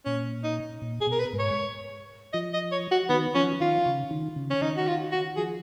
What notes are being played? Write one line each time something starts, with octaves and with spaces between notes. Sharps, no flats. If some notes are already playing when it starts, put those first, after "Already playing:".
A#2 C#4
D#4
A#2
G#4
B2 A#4
B4
G#2
C#5
F3 D#5
D#5
C#5
F#4
D#3 B3
F3 C#4
D#3 F4
C#3
D#3
C#3
C#4
D#3 D#4
F#4
F4
F#4
F3 G#4